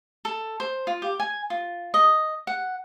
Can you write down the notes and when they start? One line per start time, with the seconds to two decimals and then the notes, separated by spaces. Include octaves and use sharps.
0.25 A4
0.60 C5
0.87 F4
1.02 G4
1.20 G#5
1.50 F4
1.94 D#5
2.47 F#5